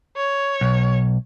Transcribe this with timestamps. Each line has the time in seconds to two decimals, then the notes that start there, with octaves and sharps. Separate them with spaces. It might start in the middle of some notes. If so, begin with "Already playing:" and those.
0.17 C#5
0.61 B1